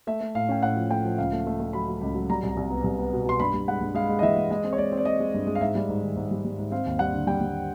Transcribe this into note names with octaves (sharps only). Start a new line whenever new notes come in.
A3 E5
A3
A2 F5
C#4 G5
A2 F#5
F3
A3 G5
F3
C#2 F5
A3
A3
A3
F#3 B5
F#3
C#2
F#3
G3 A#5
C2
C2
B3
C2
B3
B2
B2 C6
G2 B5
G2
G#3 F#5
G2
G#3 F5
G#3
D#5
E3 E5
G#3
G#3 D#5
C4
C#5
G#3 D5
C4
D5
C4 D#5
G#3
G2
G#3
F5
G#2 E5
G3
G#2
D#3
G#2
G3
G3
G#2
C4 F5
D#2
G3 F#5
D3
G3 G5
G3